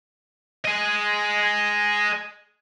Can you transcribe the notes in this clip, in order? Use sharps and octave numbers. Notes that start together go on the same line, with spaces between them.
G#4 D#5